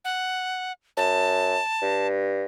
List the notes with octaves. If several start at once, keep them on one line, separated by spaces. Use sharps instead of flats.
F#5
F#2 A5
G2